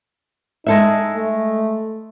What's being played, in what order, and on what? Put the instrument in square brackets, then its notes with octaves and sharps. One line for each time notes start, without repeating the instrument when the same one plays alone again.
[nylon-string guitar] G#3 A4 E5 [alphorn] D#4
[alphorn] A3